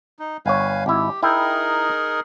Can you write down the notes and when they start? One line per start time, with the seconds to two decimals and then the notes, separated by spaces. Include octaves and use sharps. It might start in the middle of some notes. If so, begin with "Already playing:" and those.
0.19 D#4
0.46 G1 B4 C#5 F5 G#5
0.86 G#1 E4 G4
1.23 D#4 E4 G#4 A#4 G5